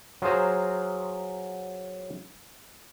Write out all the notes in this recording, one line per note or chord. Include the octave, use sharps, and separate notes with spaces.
F#3 F4 G#4 C5 A#5